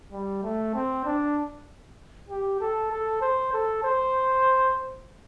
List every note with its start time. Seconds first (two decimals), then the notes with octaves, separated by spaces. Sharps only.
0.12 G3
0.43 A3
0.74 C4
1.05 D4
2.29 G4
2.60 A4
2.92 A4
3.21 C5
3.54 A4
3.84 C5